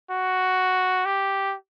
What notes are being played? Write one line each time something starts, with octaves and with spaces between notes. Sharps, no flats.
F#4
G4